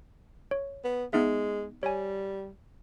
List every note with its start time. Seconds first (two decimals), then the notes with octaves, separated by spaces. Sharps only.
0.51 C#5
0.84 B3
1.13 G#3 B3 D#4 E5
1.83 G3 C#5 G#5